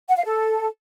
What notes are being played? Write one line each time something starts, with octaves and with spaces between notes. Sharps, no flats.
F#5
F5
A4